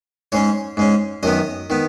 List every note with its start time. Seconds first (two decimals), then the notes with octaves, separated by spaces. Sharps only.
0.32 G#2 G#3 C#4 C#5
0.77 G#2 G#3 C#4
1.23 F#2 D#3 B3 D#5
1.70 D#3 B3